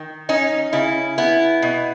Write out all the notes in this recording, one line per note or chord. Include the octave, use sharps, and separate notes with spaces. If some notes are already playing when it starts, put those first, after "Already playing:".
Already playing: D#3
C#4 D#4
C#3 E4
B3 E4
B2